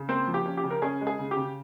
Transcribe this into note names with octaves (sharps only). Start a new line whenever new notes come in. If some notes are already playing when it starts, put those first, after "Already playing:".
Already playing: C#3
A#3 C4 C5
F3
G4
C#4
G4
C#3
A#4
C#4 G#4
G#3
G#4
C#3
G4
C#3